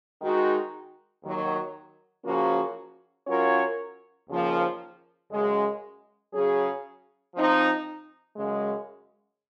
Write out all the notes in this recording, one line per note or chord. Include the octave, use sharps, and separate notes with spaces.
D#3 G#3 D#4 F#4
D#2 D#3 F#3
C#3 F3 A#3 C#4 F#4
F#3 C#4 F4 A#4 C#5
D#2 C#3 F3 A#3
F#2 C#3 G#3
C#3 F#3 C#4 G#4
F3 C4 D#4
F#2 C#3 G#3